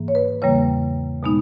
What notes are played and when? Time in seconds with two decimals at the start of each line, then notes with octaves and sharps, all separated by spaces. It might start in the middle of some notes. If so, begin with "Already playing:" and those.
Already playing: G#2 E3 A#3
0.08 C#5
0.15 B4
0.42 E2 C#3 E3 G3 A#3 C#5
1.23 B2 G#3 B3 D#4